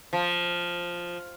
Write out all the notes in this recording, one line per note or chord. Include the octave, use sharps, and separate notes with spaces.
F3